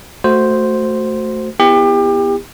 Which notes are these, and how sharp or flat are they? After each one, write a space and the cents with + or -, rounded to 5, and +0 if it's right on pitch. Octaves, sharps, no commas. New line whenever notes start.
A3 +0 F#4 +0 C5 +0
B3 +0 E4 +0 G4 +30